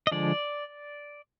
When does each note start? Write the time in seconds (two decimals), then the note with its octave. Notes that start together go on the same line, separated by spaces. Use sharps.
0.07 D#5
0.12 D3 F3 G#3 D5